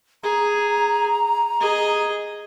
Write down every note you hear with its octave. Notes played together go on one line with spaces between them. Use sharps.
G#4 A#5
G#4 D#5